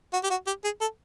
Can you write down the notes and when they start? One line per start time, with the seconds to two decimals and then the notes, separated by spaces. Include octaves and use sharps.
0.13 F#4
0.23 G4
0.30 F#4
0.47 G4
0.64 G#4
0.81 A4